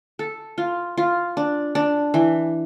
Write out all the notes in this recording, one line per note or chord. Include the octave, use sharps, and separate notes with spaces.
A4
F4
F4
D4
D4
E3